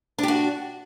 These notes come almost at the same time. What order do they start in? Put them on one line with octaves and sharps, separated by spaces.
D4 G4 F#4